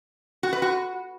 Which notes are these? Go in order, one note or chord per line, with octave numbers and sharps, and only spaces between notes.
F#4
B4
F#4